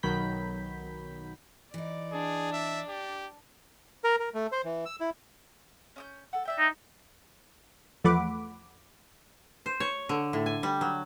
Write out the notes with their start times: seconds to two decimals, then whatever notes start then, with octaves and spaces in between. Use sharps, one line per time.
0.03 B1 D#3 F#3 B5 G6 B6
1.74 E3 D#4 D5
2.12 D4 G#4
2.53 E5
2.89 G4
4.04 A#4
4.20 A#4
4.34 A3
4.52 C5
4.65 E3
4.85 E6
5.00 E4
5.96 C#4 D#6 G6
6.33 A4 F#5
6.45 D5 E5 G5
6.58 D#4
8.04 E2 F3 A3 F#5 B5 D6
9.66 C5
9.80 C#5
10.09 D3
10.33 A2
10.46 G#5
10.63 G3
10.81 F#3